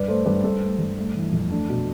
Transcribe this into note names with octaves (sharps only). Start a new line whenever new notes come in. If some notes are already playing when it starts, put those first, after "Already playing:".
Already playing: G2 B4 D5
A3 A4 C5
G2 B4 D5
G2 A4 C5
A3
G2
A3
E3
F2
A3 D4
B2